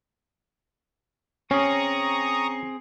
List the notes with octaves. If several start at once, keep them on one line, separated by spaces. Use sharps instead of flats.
C4 C#4 G#4 A#5 C#6 D#6